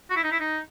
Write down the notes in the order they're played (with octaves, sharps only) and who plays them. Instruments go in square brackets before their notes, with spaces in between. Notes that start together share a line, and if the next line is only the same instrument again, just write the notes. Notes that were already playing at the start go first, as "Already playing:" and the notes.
[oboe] F#4
E4
D#4
E4
D#4